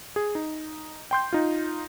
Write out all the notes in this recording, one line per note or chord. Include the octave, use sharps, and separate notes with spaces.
G#4
D#4
G5 C6 G6
D#4 F4